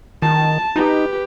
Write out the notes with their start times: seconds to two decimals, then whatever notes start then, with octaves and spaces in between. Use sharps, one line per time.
0.22 D#3 A5
0.76 D#4 G4 B4